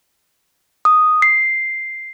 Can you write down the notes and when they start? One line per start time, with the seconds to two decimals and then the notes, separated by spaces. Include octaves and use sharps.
0.85 D#6
1.22 C7